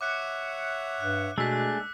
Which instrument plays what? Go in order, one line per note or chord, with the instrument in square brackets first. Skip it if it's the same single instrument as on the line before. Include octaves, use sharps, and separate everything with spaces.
[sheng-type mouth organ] C#5 E5 F#5 [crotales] D6 F#6 C#7
[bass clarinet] G2 [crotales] F#6
[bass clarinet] B2 [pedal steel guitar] G#3 A3 D4 [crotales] E6 B6